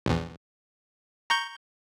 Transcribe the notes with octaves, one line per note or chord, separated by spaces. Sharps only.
A#1 E2
A#5 C#6 G6